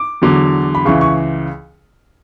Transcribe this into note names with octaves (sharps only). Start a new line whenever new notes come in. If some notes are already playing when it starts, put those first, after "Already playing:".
Already playing: D6
E2 D3 F#3
B5
C#2 C#3 E3 C#6
C#6